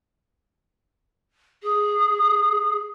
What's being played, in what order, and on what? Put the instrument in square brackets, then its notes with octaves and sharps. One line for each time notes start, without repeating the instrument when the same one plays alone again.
[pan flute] G#4